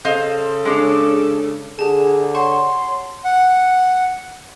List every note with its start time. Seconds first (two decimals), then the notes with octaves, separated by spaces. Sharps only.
0.05 C#3 A4 C5 D#5 F5
0.65 G#3 D4 C#5
1.79 D3 G4 G#4 A5
2.35 C#5 F#5 A5 C6 C#6
3.24 F#5